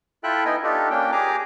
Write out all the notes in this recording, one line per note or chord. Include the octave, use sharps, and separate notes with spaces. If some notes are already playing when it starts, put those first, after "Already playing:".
E4 F4 A4 E5 G5 F#6
B3 D#4 E4 D#5 G5 G#5
D4 D#4 F4 G4 A4
A#3 C#4 D4 G5
G4 G#4 G#5 A#5 D6